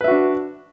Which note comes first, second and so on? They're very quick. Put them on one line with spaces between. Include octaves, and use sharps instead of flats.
B4 E5 F#4 D4